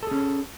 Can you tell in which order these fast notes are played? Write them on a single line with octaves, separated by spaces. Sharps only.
A4 G#4 C#4